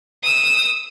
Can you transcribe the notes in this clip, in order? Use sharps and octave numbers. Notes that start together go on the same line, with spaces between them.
D#6 E6